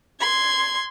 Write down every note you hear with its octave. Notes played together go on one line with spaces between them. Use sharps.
C6 G#6